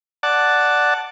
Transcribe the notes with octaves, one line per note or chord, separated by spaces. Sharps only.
D5 F#5 A5